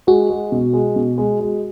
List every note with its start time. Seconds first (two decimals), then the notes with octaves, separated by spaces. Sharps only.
0.07 G#3 F#4
0.30 G#3
0.52 B2
0.73 G#3
0.96 B2
1.18 G#3
1.40 G#3